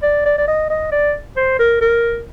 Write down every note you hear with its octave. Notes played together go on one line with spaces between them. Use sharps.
D5
D5
D5
D#5
D#5
D5
C5
A#4
A#4